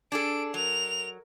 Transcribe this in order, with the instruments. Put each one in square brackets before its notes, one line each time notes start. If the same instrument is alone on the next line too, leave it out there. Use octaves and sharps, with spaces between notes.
[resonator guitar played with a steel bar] D4 G#4 A4 [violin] D7
[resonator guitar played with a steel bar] F#3 [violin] A#4 F7